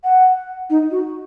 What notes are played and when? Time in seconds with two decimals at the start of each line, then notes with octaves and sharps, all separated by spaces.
0.04 F#5
0.70 D#4
0.91 F#4